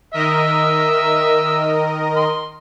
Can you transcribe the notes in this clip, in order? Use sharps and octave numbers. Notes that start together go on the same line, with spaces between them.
D#3 A#4 D#5 E5 E6
C6